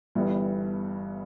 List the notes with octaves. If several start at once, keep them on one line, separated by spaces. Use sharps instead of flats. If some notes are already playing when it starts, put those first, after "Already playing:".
G1 G2 E3 G3 B3